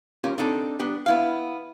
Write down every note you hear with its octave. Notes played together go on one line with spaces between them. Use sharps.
C#4 F4 G4 A#4
C4 D4 D#4 A4
B3 D4 G4
B3 E4 F5